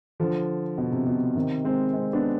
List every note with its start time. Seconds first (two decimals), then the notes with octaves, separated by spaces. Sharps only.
0.20 D3 F3
0.78 B2
0.92 C3
1.06 B2
1.35 C3 D#3
1.64 G#3 C4
1.93 G#3 C4
2.13 B3 D4